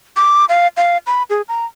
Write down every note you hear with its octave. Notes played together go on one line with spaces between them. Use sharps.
D6
F5
F5
B5
G#4
A#5